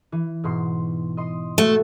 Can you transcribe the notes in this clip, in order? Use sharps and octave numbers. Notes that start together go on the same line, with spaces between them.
E3
G#2 B2 C6
D#5 C6 D#6
A3 F#4 E5